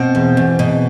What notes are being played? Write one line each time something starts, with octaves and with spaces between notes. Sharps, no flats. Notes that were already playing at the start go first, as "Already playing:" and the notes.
Already playing: B2 C4
E2
E2
B2